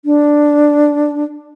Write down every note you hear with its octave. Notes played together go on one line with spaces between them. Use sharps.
D4